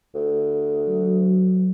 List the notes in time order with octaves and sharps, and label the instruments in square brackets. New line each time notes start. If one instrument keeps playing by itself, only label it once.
[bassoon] D2
[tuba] F#3